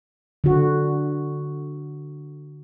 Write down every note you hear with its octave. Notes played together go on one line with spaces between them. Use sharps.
D3 F#4